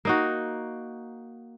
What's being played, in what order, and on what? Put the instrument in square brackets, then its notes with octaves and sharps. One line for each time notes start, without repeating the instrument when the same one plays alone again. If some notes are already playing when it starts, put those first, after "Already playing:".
[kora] A#3 D#4 F#4